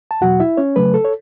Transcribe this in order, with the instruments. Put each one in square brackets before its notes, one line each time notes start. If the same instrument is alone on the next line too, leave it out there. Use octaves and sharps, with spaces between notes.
[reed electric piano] A5
E2 B2 F#3 F#4 F#5
E4 E5
C#4 C#5
C#3 F#3 A3 B4
A4
C#5